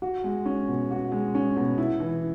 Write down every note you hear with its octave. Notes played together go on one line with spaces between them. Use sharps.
F#4
G#3
C#4
B2
F#4
G#3
C#4
B2
E4
E3